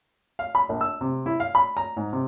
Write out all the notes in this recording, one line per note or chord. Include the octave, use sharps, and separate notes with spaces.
F5
B5
A#1
E6
C3
E4
F5
B5
A#5
G#2
C3